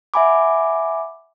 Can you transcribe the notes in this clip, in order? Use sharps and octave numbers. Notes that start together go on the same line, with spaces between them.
E5 F#5 G#5 B5 D6